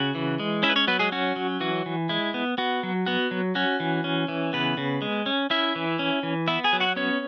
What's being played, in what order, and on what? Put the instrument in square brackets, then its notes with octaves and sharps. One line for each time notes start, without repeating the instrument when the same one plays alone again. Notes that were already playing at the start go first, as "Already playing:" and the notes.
Already playing: [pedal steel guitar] C#3 F#4 F#5
E3
G#3
C#4 E4 E5
B4
C#4 C#5
F#3 B3 B4
G#3 G#4
C#4 F#4
F#3
E3 F#4
E3
G#3 E4
B3
B3 F#4
F#3
B3 F#4
F#3
C#4 F#4
E3
C#4
E3
C#3 B3 B4
C#3
G#3
C#4
C#4 E4 E5
E3
C#4
E3
B3 E4 E5
G#4 G#5
F#3
F#4 F#5
B3 C#4 C#5